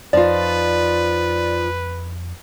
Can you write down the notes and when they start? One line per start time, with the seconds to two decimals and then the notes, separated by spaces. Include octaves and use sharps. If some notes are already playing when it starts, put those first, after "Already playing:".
0.13 F2 F3 D#4 F4 B4 D5